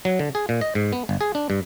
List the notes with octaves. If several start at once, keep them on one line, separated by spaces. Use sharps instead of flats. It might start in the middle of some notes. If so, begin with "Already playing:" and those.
F#3
D3
G#4
A#2
D#5
G#2
B3
G1
G#4
D4
G2